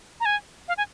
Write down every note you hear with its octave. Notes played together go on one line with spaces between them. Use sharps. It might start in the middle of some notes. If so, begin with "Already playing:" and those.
A#5
G#5
F5
G#5